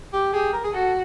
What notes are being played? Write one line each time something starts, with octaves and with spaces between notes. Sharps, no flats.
G4
G4 G#4
A#4
G#4
F#4 A4